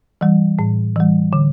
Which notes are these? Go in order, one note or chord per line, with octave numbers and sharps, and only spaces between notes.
E3 G3
A2
E3 G3
D3